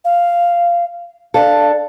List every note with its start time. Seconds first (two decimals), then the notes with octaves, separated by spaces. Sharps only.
0.05 F5
1.34 D4 A4 F5